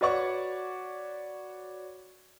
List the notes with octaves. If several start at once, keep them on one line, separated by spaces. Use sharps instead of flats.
F#4 B4 C#5 D5 F#5 C#6